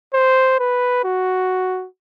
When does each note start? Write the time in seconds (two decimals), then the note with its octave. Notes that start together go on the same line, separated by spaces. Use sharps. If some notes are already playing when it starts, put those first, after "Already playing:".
0.14 C5
0.59 B4
1.04 F#4